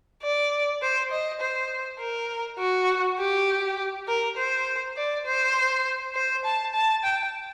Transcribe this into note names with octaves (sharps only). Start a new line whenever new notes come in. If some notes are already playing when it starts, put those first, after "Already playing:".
D5
C5
D#5
C5
A#4
F#4
G4
A#4
C5
D5
C5
C5
A5
A5
G5